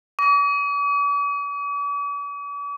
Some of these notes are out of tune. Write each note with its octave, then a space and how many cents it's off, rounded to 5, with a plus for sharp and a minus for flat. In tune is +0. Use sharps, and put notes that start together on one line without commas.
D6 -45